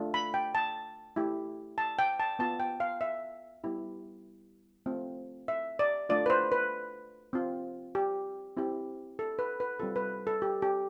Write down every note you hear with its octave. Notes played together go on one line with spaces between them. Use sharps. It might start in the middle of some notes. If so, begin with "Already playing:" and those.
Already playing: A3 D4 F4
B5
G5
A5
A3 E4 G4
A5
G5
A5
B3 F4 A5
G5
F5
E5
G3 B3 E4 G4
A3 C4 F4
E5
D5
A3 D4 F4 D5
B4
C5
B4
C4 F4
G4
C4 E4 G4
A4
B4
B4
G3 C4 F4 A4
B4
A4
G4
G4